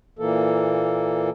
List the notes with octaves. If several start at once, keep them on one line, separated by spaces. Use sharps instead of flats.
A#2 E3 A#3 A4